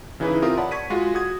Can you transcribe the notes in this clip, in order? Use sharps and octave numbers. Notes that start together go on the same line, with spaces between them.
C#3 E3 D#4 E4 G#4 B4
C4 F4 G4 A#4 E5 D#6
C#5 D5 F#5 A5 B5
C#6 G#6 B6 D#7
G#3 F4 F#4
F#4 D#6 G#6